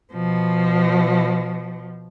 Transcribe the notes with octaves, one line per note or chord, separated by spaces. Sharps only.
B2 F3